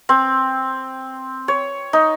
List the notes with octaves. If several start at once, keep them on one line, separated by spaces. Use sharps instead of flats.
C4
C#5
D#4